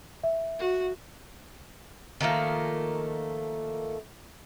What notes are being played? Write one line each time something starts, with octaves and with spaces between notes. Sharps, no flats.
E5
F#4
D#3 F3 A3 A#3